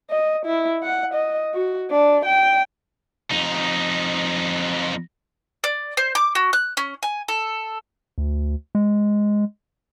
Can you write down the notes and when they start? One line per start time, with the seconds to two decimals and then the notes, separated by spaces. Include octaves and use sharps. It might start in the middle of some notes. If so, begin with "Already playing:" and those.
0.10 D#5
0.46 E4
0.83 F#5
1.14 D#5
1.54 F#4
1.90 D4
2.26 G5
3.31 F2 D#4
5.64 D5
5.97 C5
6.15 D6
6.35 F#4
6.53 F#6
6.77 C#4
7.03 G#5
7.28 A4
8.18 D2
8.75 G#3